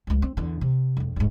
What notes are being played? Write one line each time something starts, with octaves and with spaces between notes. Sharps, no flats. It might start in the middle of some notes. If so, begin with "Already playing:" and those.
C#2 F3
C4
E2 D3
C3
E1 F2
D#1 G#2